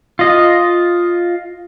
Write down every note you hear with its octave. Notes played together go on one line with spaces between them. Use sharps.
F4 D#5